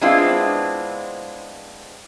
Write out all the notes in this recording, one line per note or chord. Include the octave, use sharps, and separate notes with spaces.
G#3 B3 C4 D4 E4 F4